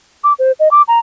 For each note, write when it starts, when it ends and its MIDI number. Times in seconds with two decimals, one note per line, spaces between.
0.24 0.33 86
0.39 0.52 72
0.60 0.68 75
0.71 0.82 86
0.88 0.99 82